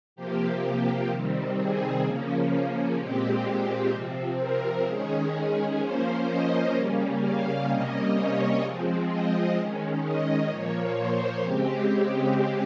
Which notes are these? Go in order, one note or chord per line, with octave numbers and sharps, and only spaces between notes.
C3 F3 A#3 G4
C3 D#3 G3 C4
G#4
C#3 F3 A#3 C#4
A#2 G#3 C4 G4
C3 F3 C4
A#4
D#3 G#3 C#4 G#4
F3 A#3 C#4 C5
D#5
C#3 G3 A#3 C#4
F5
C3 G3 A#3 C#4 D#5
C#5
F3 G#3 C4
D#5
D#3 G#3 C#4
D#5
A#2 F3 A#3 C#5
C5
C#3 G#3 C4 G4